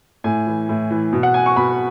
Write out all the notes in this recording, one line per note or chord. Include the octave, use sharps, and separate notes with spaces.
A2 G#5
E3
A2
E3
B2
F#5
G#5
C#6
B2 B5